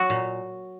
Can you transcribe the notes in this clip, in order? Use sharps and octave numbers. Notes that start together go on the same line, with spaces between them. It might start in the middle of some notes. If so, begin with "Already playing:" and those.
Already playing: F#3 F#4
A#2